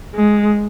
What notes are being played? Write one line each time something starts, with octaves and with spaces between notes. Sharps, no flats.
G#3